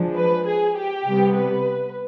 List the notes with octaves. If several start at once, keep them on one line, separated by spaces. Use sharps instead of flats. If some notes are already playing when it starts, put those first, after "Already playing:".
Already playing: F3 G#3 D4
B4
G#4
G4
C3 G3 B3
B4